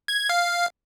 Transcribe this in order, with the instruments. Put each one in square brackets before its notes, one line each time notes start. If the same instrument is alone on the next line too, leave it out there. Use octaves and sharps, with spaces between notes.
[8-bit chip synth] G#6
F5